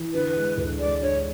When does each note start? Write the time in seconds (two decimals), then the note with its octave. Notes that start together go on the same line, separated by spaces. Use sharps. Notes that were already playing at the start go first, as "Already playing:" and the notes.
Already playing: E3
0.13 D3 B4
0.36 G#3
0.57 D2
0.79 G#3 D5
1.02 D3 C#5